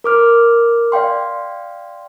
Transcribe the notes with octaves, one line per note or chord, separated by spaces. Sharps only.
A#4 D6 F6
D5 F5 G5 C6